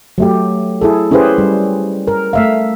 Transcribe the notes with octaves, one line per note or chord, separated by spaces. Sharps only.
F#3 A3 G4
E4 G#4 A4
C#4 E4 G4 G#4 B4 C5
G3
A#4
A3 E5 F5